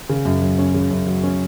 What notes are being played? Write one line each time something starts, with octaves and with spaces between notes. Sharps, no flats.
C#3
F#2
F#3
C#4
C#3
F#2
F#3
C#4